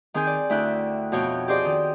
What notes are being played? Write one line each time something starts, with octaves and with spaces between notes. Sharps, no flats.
D#3 C4 G#4 G#5 G6
D5
D2 E4 E5 G5 F#6
F2 B2 C#5 G5
G4 G#4 C5 D5 D#5 G5
D#3